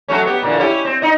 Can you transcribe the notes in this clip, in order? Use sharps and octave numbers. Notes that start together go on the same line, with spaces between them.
F#3 A3 C#4
B3 G4
A#2 D3 E3
C#4 E4 G4
C4
D#4 D#5